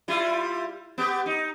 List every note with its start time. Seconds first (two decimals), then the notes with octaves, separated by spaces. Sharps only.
0.08 G3 E4 F4
0.98 B3 G4
1.26 D#4